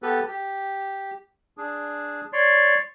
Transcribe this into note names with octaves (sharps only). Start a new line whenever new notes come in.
B3 G4 A4 B4
G4
D4 G#4
C#5 D5 C6